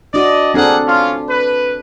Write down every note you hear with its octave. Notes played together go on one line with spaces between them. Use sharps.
D4 F#4 D5 D#5
A#3 C4 D4 G#4 A4 F#5
C#4 F4
B4